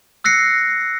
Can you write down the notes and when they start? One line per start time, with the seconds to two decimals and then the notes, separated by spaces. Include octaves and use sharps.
0.24 E6 F#6 A#6 C7 C#7